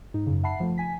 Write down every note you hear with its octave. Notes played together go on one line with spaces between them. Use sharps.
G#2 D#4
F#2 C#3
E5 F#5 A5 B5 C7
F3 A3
G#5 B6